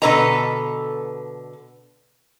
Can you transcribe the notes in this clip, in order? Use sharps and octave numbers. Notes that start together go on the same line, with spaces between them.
B2 D3 A4 B4 D#5 A#5